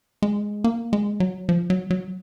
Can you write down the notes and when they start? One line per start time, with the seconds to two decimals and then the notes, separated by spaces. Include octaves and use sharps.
0.22 G#3
0.64 A#3
0.93 G#3
1.20 F#3
1.49 F3
1.70 F#3
1.90 F#3